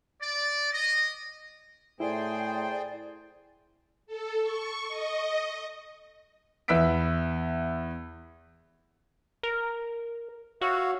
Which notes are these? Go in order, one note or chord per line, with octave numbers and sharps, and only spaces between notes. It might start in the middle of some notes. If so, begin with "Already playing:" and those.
D5
D#5
A2 E4 G#4 C5 D5 G5
A4
C#6
D#5
E2 B4 E5 E6 B6 D7
A#4
F#4 C#5 E5 F5